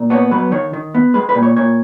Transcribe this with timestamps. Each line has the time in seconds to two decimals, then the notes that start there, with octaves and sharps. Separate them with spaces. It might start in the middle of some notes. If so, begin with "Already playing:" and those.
Already playing: A#2
0.10 B3 C#5
0.31 F#3 B4
0.52 D#3 C#5
0.73 D#3
0.95 B3
1.14 G#3 B4
1.29 B4
1.35 A#2
1.43 C#5
1.57 A#2 C#5